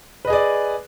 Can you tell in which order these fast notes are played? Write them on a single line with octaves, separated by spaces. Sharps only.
B4 D#5 G#4 D5